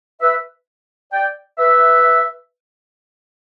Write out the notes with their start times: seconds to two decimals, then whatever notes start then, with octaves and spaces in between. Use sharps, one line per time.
0.21 B4 E5
1.13 D5 G5
1.58 B4 E5